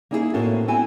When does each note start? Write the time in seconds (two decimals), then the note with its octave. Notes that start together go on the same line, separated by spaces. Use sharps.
0.11 A#3 C#4 D#4 E4 G4 G#4
0.33 A2 A#3 C4 C#4 F#4 A4
0.68 B3 C4 E4 G#5